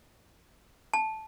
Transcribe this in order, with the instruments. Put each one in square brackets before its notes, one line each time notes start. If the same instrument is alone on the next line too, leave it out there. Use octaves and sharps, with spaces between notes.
[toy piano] A5